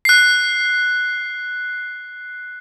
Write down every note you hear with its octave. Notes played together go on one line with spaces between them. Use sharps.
F#6 C7